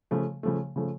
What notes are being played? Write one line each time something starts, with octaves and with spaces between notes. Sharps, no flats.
C#3 F3 A3
C#3 F3 A3
C#3 F3 A3